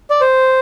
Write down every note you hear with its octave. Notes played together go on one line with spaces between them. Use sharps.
D5
C5